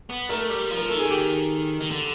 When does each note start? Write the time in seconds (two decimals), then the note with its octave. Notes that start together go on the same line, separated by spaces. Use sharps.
0.10 B3
0.29 A3 A#4
0.49 G3
0.71 F3
0.77 A#4
0.88 D#3 A4
0.99 G#4
1.10 G4
1.81 D#3
1.91 D3